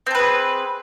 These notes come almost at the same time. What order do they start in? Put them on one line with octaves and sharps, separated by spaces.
C4 A4 B4 G#4